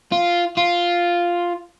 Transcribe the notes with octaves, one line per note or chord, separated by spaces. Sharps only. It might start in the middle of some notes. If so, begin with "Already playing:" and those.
F4
F4